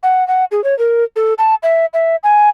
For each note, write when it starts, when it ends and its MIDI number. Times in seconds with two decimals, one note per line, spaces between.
0.03 0.26 78
0.28 0.45 78
0.51 0.63 68
0.64 0.77 73
0.79 1.04 70
1.16 1.34 69
1.38 1.55 81
1.63 1.86 76
1.94 2.16 76
2.23 2.49 80